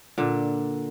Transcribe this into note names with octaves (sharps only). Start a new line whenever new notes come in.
A#2 D3